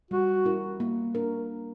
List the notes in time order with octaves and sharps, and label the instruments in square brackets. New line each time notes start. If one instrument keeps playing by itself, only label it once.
[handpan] G3 [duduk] F#4
[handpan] C#4 E4 A#4
A#3
D4 A#4